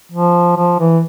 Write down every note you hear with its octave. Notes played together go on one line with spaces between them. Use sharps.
F3
F3
E3